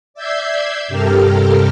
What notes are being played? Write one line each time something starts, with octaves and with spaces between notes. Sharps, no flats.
D5 E5 E6 G6 G#6 C7
G2 C3 G4 A4 A#4 F6